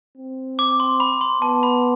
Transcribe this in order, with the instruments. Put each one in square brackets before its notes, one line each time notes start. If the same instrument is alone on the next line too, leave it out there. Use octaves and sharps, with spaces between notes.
[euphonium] C4
[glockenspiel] D6
C6
B5
C6
[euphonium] B3 [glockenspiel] A5
[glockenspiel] B5